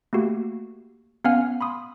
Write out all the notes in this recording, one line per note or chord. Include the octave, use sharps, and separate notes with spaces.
A3 A#3 F#4 G4
B3 C#4 F5 F#5 G#5 F6
B5 C6 D#6